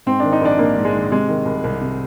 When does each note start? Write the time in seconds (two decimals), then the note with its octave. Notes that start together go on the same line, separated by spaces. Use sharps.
0.06 G#2 C4
0.20 D#3 D4
0.32 D#4
0.42 A#1 D4
0.58 A#1 A#3
0.76 G#2
0.85 G#3
0.94 D#3
1.11 C3 G#3
1.29 D#3
1.46 C2
1.64 C2
1.81 C3